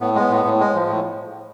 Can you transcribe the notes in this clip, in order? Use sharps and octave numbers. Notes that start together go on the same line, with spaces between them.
A2 B3
G#3 B3
A2
A2
G#3
F3
A2